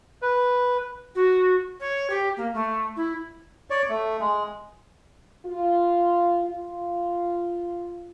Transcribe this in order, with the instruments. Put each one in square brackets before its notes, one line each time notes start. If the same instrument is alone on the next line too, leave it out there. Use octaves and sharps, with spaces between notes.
[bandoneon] B4
[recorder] F#4
C#5
G4
A#3
A3
E4
[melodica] C#5 D5
A3
G#3
[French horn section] F4
F4